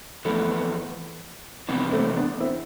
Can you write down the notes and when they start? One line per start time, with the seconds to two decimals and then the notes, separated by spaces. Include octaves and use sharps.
0.25 F2 E3 A3 B3
1.68 F2 C3 E3 B3
1.92 A3 C4
2.16 B3 D4
2.40 C4 E4